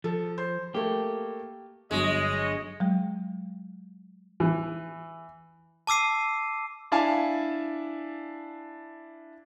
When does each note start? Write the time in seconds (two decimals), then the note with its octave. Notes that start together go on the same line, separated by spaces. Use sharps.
0.04 F3 A4
0.38 C5
0.74 A3 A#3 G4
1.91 G1 F#3 G#3 C#5 D#5
2.80 F#3 G#3
4.40 E3
5.87 A5 D6 E6 C7 D#7
6.92 D4 E4 F5 G#5 A5